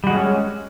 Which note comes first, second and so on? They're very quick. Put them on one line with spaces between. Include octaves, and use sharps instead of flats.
G3 F#4 G#3 C#4